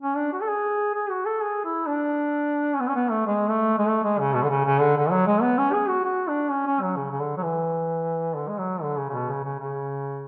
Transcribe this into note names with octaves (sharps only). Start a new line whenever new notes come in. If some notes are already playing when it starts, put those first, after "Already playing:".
C#4
D4
F#4
A4
G#4
G#4
F#4
A4
G#4
E4
D4
C#4
B3
C#4
B3
A3
G#3
A3
G#3
A3
G#3
C#3
B2
D3
C#3
C#3
D3
D3
F#3
G#3
B3
C#4
G#4
F#4
F#4
D4
C#4
C#4
F#3
C#3
C#3
D3
F#3
E3
D3
G#3
F#3
D3
C#3
C#3
B2
C#3
C#3
C#3